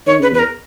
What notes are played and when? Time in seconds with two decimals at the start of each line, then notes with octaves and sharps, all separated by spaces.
0.07 D#3 C#5
0.19 C#3 B4
0.32 E2 B4
0.39 A#4